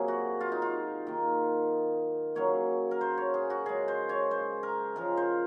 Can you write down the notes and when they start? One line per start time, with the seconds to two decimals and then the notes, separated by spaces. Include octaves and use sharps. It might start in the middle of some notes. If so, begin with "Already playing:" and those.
Already playing: C3 F#3 A#3 G#4
0.08 F#4
0.41 F4
0.52 D#4
0.62 F4
1.07 D#3 A#3
2.35 C#3 F#3 A#3 C#5
2.91 A#4
3.01 C5
3.18 C#5
3.34 G#4
3.50 F#4
3.66 C#3 G#3 G#4
3.88 C5
4.09 C#5
4.31 C5
4.63 A#4
4.96 C#3 F3 G#3 A#4
5.17 C5